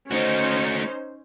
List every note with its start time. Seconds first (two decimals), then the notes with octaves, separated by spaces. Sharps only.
0.11 A3 C#4 D#4 F#4 C5